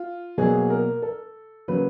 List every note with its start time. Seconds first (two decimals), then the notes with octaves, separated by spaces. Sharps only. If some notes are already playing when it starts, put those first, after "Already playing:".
Already playing: F4
0.38 B2 F#3 A#3 G#4
0.70 A#4
1.02 A4
1.68 C#3 F#3 A#3 B4